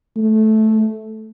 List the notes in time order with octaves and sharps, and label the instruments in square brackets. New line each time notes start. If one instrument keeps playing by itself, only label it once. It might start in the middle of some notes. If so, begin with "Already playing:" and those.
[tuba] A3